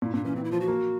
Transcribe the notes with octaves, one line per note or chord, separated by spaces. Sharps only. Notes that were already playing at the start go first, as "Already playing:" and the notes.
A#2 E4
A#2 D4
E3 C#4
E3 C4
E4
F3 F4
F#4
A#3